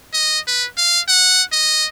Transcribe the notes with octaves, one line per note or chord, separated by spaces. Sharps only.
D#5
B4
F5
F#5
D#5